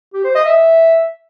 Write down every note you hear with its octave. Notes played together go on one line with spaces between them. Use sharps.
G4
C5
D#5
E5